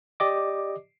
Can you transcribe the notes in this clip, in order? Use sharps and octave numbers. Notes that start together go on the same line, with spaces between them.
G4 D5 D#5 D6